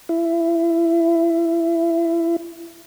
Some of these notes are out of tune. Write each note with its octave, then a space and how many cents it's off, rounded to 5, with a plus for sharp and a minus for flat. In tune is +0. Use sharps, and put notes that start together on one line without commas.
E4 +25